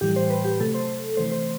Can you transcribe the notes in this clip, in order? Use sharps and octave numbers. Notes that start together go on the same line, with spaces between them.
A2 E3 G3 G4
C5
B4
G4
C3 F#3 A3 A4
C5
C3 E3 A3 C5
C5